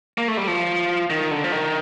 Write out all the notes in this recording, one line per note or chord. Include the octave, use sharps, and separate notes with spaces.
A#3
A3
G3
F3
D#3
D3
F3
D#3